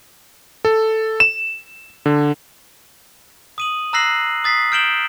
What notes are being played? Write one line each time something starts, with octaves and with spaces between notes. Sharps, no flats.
A4
E7
D3
D#6 D#7 F#7
A#5 E6 F#6 A#6 C7 F#7
D#6 A6 B6 C7
F6 G6 D7 E7 F#7 G7